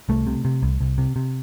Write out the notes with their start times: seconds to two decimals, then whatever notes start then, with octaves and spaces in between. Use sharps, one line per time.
0.09 C2 A3
0.27 C3
0.45 C3
0.62 C2
0.81 C2
0.98 C3
1.16 C3